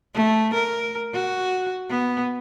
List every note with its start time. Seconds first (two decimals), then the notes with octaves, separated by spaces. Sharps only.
0.14 A3
0.54 A#4
1.13 F#4
1.89 B3